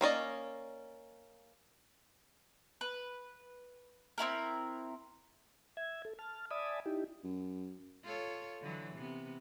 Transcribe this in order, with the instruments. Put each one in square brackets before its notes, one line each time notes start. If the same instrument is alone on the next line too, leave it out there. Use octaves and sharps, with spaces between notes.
[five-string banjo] A#3 C#4 D5 D#5
[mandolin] B4
C4 C#4 E4 A#4
[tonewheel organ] E5 G#6
A4
A5 F6
D5 E5 G#5 A5 B5 D#6
D#4 E4 G4
[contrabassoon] F#2
[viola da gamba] F4 A4 C#5
D3 E3 F#3
C3 B3